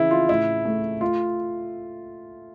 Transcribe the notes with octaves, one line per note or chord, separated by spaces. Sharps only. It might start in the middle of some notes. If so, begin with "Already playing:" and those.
Already playing: C#3 E3 E4
F4
A2 E4
A3
A3 F4